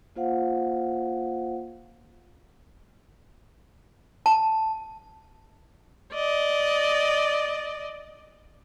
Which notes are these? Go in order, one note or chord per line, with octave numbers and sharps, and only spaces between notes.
A#3 F4 C5 F5 F#5
A5
D5 D#5